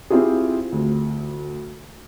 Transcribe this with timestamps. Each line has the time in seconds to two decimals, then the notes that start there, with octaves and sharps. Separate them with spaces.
0.10 C4 E4 F4 G4 G#4
0.72 D2